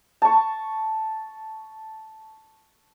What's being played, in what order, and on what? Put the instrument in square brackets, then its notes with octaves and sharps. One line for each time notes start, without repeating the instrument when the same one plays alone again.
[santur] A5 C#6